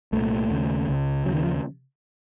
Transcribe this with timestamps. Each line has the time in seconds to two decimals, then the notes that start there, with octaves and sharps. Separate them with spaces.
0.12 C2 A#2 A3
0.50 D#2 C#3
0.88 C#2 C#3
1.25 D#2 C#3 F#3
1.35 D#3
1.43 F3